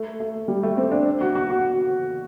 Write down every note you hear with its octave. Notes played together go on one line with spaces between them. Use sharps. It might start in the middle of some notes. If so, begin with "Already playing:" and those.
Already playing: A3
A3
G3
A3
C4
D4
F#4
F#4
F#4